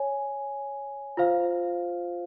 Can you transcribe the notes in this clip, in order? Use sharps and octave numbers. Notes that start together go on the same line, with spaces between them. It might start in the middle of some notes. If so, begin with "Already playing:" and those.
Already playing: C#5 G#5
F4 C5 F5